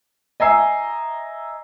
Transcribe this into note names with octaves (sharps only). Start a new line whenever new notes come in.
D#5 E5 G#5 A#5 E6 C7